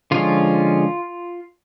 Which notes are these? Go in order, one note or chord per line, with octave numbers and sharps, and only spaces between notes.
D3 F3 G#3 C#4 F4